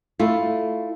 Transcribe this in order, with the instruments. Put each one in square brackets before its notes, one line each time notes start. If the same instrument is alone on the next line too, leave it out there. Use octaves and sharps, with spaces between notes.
[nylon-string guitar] A3 E4 F4